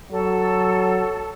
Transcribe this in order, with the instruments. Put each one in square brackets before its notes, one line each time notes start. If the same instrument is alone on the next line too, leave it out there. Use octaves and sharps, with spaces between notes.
[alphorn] F#3 [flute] A4